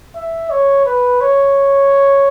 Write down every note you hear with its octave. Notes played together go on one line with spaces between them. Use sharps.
E5
C#5
B4
C#5